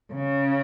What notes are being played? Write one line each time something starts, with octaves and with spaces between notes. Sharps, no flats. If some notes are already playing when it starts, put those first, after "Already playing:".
C#3